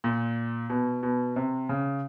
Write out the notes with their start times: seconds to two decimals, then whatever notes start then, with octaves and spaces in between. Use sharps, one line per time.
0.04 A#2
0.70 B2
1.03 B2
1.36 C3
1.69 C#3